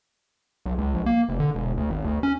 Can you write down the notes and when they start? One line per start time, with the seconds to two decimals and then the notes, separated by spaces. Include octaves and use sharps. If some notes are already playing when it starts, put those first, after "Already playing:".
0.66 B1
0.78 C#2
0.94 A#1
1.06 A#3
1.29 F1
1.40 D3
1.55 E1
1.77 D2
1.90 G#1
2.05 D2
2.23 C#4